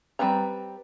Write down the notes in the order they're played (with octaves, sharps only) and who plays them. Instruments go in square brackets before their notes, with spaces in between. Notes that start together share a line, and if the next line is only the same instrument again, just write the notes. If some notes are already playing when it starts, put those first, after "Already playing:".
[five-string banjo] G3 C4 A#4 B4 A#5